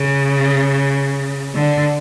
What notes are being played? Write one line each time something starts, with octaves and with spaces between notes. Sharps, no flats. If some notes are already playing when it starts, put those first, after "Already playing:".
Already playing: C#3
D3